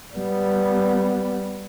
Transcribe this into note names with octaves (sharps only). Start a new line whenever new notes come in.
G3 B3